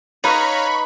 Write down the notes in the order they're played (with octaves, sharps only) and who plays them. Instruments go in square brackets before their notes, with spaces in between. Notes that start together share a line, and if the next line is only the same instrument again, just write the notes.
[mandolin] D#4 [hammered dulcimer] B4 [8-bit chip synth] C#5 F5 A#5 [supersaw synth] B5 C#6